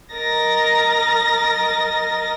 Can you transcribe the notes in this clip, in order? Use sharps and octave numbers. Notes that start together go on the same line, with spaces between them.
A#4 D#5 A6 A#6